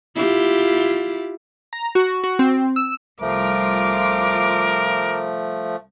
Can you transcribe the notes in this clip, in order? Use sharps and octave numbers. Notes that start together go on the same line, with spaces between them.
E4 F4 G4
A#5
F#4
F#4
C4
E6
C2 F3 A3 F4 A#4 D6